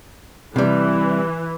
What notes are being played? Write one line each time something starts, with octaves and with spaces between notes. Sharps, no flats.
C3 E3 G3